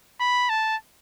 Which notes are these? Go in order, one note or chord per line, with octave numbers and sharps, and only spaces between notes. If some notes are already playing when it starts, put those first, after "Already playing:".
B5
A5